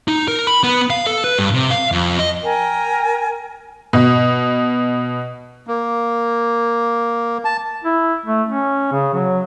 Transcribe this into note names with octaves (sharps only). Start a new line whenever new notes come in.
D#4
A#4
B5
B3
F5
A4
B4
G2
C3
F5
F2
D#5
A#4 G5 G#5
B2
A#3
A5
E4
A3
C#4
C#3
F#3